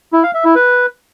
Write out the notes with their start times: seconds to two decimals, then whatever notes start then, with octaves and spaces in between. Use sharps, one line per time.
0.13 E4
0.23 F5
0.34 E5
0.45 E4
0.55 B4